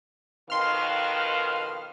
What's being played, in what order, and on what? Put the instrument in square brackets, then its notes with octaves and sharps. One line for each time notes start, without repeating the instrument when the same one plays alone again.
[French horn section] F2 B2 D#3 [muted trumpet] F5 [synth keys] C6 F6